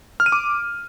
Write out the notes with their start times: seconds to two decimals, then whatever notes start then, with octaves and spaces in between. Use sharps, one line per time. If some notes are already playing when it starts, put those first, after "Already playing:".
0.20 F6
0.26 D#7
0.32 D6